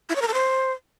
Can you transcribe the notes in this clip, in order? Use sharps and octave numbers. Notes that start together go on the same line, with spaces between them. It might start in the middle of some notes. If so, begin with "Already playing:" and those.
E4
C#5
A#4
A4
C5